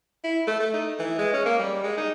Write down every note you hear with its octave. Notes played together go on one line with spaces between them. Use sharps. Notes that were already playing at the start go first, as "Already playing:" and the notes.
E4
A3
A3
D#4
E3
G#3
C#4
A#3
G3
G#3
D#4